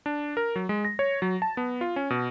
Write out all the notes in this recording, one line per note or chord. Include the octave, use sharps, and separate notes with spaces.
D4
A#4
F#3
G#3
A#6
C#5
F#3
A5
B3
F4
C#4
B2